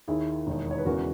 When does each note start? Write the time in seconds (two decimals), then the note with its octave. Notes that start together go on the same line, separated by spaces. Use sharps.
0.08 D#2 D#3 E4 G#4
0.47 E1 D#2 D#3
0.71 C#5
0.78 B4
0.85 E1 E2 C#3 E3 F#4 A#4